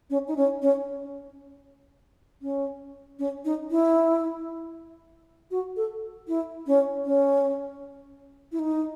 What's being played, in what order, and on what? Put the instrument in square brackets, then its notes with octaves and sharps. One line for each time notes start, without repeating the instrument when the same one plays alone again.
[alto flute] C#4
D#4
C#4
C#4
C#4
C#4
D#4
E4
F#4
A4
E4
C#4
C#4
E4
D#4